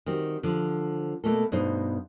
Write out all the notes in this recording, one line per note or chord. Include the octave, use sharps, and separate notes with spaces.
D#3 G3 C4 F#4
D3 F3
B2 A3 A#3 A4
G2 B2 D#4 C5